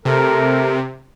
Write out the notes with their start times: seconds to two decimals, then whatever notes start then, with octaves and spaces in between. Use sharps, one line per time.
0.05 C3 A3 A4 A#4